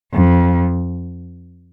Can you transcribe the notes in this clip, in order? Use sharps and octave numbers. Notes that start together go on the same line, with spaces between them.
F2